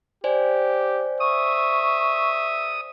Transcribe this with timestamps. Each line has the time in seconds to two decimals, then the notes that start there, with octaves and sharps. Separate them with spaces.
0.24 G4 C5 D5 G#5
1.20 E5 C#6 D#6